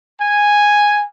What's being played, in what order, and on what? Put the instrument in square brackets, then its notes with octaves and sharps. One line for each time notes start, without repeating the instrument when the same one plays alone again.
[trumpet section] G#5